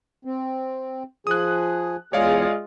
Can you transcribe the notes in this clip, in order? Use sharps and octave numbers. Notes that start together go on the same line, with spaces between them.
C4
F3 G#4 D#6 F#6
E2 G#3 F4 G#4 C#5 D5 F5